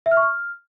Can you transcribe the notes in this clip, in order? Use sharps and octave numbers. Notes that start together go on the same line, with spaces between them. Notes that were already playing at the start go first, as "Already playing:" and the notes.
E5
F6
C#6
F6